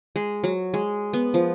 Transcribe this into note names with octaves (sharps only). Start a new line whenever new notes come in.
G#3
F#3
G#3
B3
F3